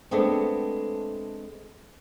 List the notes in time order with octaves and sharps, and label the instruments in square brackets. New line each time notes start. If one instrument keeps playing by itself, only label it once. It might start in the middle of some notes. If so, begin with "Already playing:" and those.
[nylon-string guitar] G#3 A3 B3 C4 D4